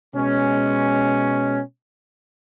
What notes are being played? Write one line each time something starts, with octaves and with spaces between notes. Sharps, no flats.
B2 G#3 C#4